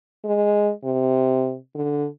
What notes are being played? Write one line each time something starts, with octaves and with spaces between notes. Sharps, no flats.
G#3
C3
D3